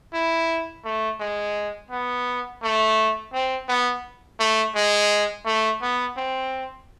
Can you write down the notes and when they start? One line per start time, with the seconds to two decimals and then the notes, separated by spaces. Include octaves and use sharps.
0.13 E4
0.85 A3
1.20 G#3
1.91 B3
2.63 A3
3.33 C4
3.68 B3
4.40 A3
4.76 G#3
5.46 A3
5.82 B3
6.17 C4